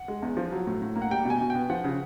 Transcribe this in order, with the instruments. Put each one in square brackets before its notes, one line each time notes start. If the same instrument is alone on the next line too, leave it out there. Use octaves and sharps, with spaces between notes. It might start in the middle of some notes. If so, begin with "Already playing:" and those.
Already playing: [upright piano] F#5
G#3
E2
F3
F#3
A2
A2
A#3
F#5
G3 G5
B2 G#5
B2
G5
B3
F3 F#5
C#3